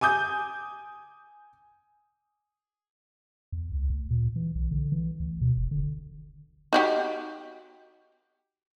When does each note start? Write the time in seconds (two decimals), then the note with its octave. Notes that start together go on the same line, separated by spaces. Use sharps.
0.01 G#5 D6 D#6 G6
3.52 E2
3.72 C#2
3.90 D2
4.10 A#2
4.36 E3
4.55 B1
4.71 D3
4.92 E3
5.20 D2
5.41 B2
5.57 F1
5.71 D3
6.73 D#4 F#4 G4